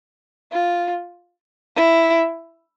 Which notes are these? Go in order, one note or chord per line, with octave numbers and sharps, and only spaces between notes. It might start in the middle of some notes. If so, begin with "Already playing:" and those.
F4
E4